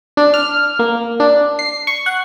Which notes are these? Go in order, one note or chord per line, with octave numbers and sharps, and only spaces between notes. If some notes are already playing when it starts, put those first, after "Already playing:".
D4
F6
A#3
D4
C7
C#6
F#5